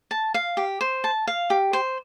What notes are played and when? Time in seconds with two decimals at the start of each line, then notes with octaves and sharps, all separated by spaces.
0.11 A5
0.34 F5
0.57 G4
0.81 C5
1.04 A5
1.27 F5
1.50 G4
1.73 C5